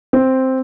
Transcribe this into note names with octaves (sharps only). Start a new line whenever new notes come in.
C4